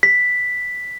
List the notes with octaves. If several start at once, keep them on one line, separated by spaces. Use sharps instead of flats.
B6